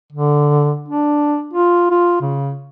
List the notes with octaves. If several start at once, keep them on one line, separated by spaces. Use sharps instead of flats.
D3
D4
F4
F4
C#3